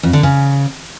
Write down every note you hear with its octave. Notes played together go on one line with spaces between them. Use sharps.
F2
D3
C#3